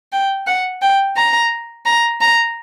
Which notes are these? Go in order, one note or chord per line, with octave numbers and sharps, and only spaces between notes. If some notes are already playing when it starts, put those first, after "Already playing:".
G5
F#5
G5
A#5
A#5
A#5